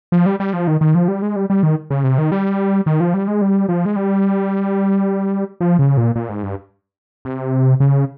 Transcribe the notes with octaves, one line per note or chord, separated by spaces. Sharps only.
F3
G3
G3
F3
D#3
D#3
F3
G3
G#3
G3
G3
D#3
C#3
C3
D#3
G3
D#3
F3
G3
G#3
G3
F3
G#3
G3
F3
C#3
A#2
A#2
G#2
G2
C3
C#3